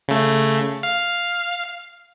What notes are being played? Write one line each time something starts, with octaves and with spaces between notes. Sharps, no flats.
C#3 A3
F5